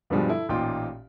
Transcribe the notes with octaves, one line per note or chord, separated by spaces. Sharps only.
G2 B2 D3 F3 G3 G#3
E4 A4
A1 A#2 D#4 F4 G5 C6